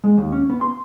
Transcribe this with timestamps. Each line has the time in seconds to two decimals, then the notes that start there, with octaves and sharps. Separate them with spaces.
0.04 G#3
0.18 D#2
0.32 C#4
0.50 B3
0.61 C6